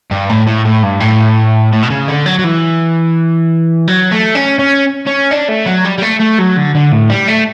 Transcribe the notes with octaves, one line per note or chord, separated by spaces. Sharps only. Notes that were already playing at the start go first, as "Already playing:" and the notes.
G2
A2
A2
A2
G2
A2
A2
B2
C#3
D3
F#3
F#3
E3
F#3
A3
C#4
C#4
C#4
D4
A3
F#3
G3
G3
A3
A3
F#3
D3
D3
A2
G3
A3